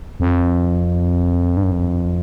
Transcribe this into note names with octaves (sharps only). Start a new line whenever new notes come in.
F2
G2
F#2
F2